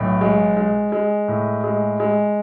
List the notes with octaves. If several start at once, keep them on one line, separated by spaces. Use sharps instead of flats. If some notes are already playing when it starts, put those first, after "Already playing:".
Already playing: B1 A2
G#3
G#3
G#3
A2
G#3
G#3